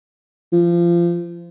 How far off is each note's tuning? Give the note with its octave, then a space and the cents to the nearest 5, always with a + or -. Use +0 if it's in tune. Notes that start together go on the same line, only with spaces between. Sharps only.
F3 -25